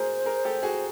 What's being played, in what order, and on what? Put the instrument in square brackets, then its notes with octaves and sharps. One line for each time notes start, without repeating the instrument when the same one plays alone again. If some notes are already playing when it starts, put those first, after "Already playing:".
Already playing: [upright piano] F#4 G#4 A#4 [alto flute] C5
[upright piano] G#4 A#4
G4 A4
F#4 G#4